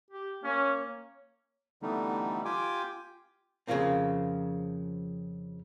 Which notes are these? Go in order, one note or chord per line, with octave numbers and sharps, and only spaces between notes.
G4
A#3 C#4 C#5
D3 E3 G3 A3 B3 D#4
F4 G4 G5 G#5 D6
F2 C#3 E3 F3 A#3 C4